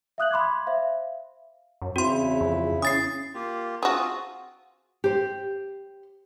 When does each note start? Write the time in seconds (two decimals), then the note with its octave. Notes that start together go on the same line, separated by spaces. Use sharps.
0.18 E5 F5 D#6 F#6 G6 F#7
0.31 B5 C6 D6 G#6
0.67 C5 E5 F5
1.82 F#2
1.96 E2 C#3 C4 E4 F#4 C6
2.41 F2
2.82 C#4 D#6 A6 C7
3.34 A#3 F4 G4
3.83 C4 F4 F#4 G#4 D#6
5.04 G4 C5